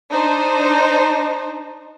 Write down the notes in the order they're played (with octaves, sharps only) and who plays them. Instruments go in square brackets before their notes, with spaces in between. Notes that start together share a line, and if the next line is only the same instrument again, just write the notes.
[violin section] D4 D#4 C5